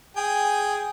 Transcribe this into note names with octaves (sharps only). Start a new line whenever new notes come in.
G#4 G5 G#5